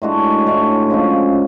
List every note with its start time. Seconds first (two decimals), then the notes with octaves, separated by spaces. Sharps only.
0.02 A2 G#3 D4 F#4
0.46 A2 G#3 D4 F#4
0.90 C#3 F3 G#3 C#4